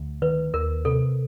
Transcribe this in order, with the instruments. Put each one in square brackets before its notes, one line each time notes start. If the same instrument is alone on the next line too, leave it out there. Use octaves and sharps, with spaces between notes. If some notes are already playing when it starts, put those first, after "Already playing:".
Already playing: [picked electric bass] D2
[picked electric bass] D#3 [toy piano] B4
[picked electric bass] D#2 [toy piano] A#4
[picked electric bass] C3 [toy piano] A4